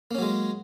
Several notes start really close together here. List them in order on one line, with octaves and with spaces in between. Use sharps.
A#3 C#4 F#3 G#3